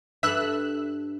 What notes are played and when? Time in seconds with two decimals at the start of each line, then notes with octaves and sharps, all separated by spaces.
0.23 G2 A4 E5 E6 F#6